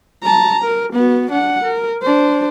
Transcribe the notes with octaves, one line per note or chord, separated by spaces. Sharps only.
A5 A#5
A#4
B3 F#4
D4 F#5
A#4
D4 C5